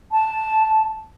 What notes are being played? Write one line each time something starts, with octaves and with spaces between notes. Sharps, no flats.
A5